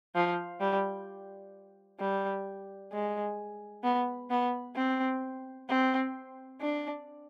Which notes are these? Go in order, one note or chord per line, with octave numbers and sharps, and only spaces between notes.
F3
G3
G3
G#3
B3
B3
C4
C4
D4